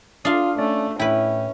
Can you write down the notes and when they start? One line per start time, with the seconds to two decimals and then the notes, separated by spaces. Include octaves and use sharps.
0.25 D4 F4 F5 D#6 C7
0.58 A3 C#4 D5
0.99 A2 C#4 E4 B4 G5